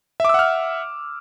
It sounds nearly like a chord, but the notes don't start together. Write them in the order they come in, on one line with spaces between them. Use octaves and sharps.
E5 D6 E6 F#5 F6